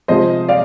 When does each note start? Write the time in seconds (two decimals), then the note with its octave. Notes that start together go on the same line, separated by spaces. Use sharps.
0.08 C3 F3 G#3 C5 D#5
0.49 D5 F5